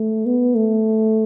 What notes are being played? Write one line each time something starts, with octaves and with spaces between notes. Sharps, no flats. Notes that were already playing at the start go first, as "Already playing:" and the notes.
Already playing: A3
B3
A3